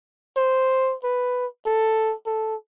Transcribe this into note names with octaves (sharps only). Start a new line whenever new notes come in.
C5
B4
A4
A4